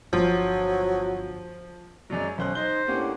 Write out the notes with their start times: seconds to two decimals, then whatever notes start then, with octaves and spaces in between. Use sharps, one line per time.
0.13 G1 F3 F#3
2.10 F#2 F#3 G#3 D5 A#5
2.38 B1 F#3 C#4 C5 F#6
2.55 D#4 C5 D#5 G7
2.88 A2 A#3 C#4 D4 G4 F#5